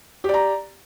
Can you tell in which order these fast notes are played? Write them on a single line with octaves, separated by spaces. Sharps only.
G4 D5 A#5